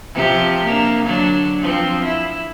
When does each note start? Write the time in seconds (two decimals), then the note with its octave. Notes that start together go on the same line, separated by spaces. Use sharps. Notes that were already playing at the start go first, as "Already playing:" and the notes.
0.14 C3 F3 G4
0.65 A#3 D4
1.05 D3 F#3 D4
1.61 F3 C4
2.04 E4